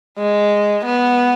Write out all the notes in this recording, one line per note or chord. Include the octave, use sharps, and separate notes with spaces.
G#3
B3